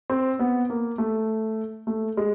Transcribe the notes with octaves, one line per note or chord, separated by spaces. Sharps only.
C4
B3
A#3
A3
A3
G#3